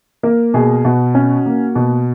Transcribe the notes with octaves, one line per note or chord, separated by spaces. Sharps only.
A#3 A#4
B2 G#4
B2 F#4
C#4
A#3
B2